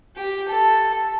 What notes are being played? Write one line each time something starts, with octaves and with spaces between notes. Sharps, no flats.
G4
A4